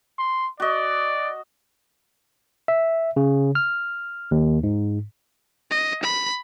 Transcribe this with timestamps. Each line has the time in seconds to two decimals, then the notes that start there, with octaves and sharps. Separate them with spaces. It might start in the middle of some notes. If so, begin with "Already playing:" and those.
0.18 C6
0.60 F#4 D5 D#5
2.68 E5
3.16 C#3
3.55 F6
4.31 D#2
4.63 G#2
5.70 D#5
6.03 B5